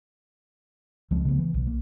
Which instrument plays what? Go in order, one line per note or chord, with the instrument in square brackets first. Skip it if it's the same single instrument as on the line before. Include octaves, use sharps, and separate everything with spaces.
[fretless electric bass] C#2 F3 G#3 C4
C#3 A3 B3
E3
B1
A#3